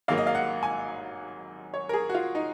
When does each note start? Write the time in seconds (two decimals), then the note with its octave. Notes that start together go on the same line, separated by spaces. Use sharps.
0.08 G#1 G#2 F#3 A#3 F5
0.18 D#5
0.27 F5
0.35 F#5
0.63 G#5
1.74 C#5
1.89 A#4
1.93 G#4
2.09 F#4
2.15 F4
2.35 D#4